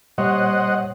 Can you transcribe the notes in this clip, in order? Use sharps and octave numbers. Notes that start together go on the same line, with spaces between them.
A#2 G3 C5 C#5 D#5 F#5